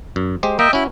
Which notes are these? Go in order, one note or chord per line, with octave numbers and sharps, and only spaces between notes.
F#2
G#3 G4 C5
A#3 D#5 E5 G5
C#4 E4 F#4